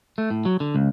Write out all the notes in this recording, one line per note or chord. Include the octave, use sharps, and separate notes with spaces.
A3
A2
F#3
D3
C#2